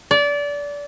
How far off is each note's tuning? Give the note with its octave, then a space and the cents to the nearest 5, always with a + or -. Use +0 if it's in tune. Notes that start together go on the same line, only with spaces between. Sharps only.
D5 -25